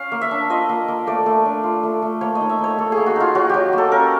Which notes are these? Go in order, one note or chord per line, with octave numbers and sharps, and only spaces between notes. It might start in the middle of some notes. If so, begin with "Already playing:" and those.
Already playing: C#4 F5
A#3
E5
D4
F4 D#5
A#3
A#3
A3 D5
A3
D4
F4
A3
A3
A#3 C#5
D#5
D#4
E5
D#4
C#5
A#3 A4
A#3 G#4
F#4
D#4 F4
F#3 F#4
F#3 G4
A#3 A4
C#4 A#4